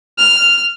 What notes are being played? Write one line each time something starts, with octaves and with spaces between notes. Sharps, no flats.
F6